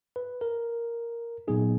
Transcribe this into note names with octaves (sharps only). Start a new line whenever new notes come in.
B4
A#4
A#2 F#3 B3 D#4 G#4